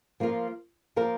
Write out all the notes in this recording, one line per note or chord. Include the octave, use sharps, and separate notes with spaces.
F3 A#3 F4 A#4
F3 A#3 F4 A#4